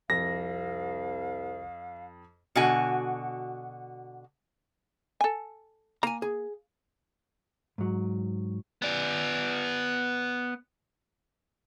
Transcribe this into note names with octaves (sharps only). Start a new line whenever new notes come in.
C2 F2 F5 A#6
B2 D3 F#4 G#5
A4 G#5
A#3 G#5 A#5
G#4
G#2 F#3
B3 D5